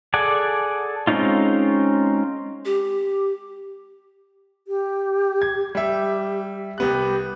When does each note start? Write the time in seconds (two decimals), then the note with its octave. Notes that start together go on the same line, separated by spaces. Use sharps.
0.14 G#4 A4 D5 F#5 G#5
1.07 G#3 C4 C#4 D#4 F4
2.65 G4
4.68 G4
5.42 G#6
5.75 G3 G4 E5
6.78 C2 B3 G4 F#6